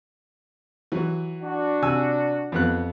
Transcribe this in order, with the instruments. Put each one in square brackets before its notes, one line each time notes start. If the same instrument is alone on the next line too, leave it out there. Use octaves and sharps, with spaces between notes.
[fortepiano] E3 F#3
[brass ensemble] D4 F#4
[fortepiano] C3 G#5 E6
F2 B3 F#6